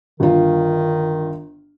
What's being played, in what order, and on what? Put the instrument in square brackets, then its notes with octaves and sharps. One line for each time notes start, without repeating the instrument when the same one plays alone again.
[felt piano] G1 F4 [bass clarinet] D#3